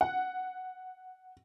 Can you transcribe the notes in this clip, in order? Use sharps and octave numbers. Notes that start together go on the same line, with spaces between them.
F#5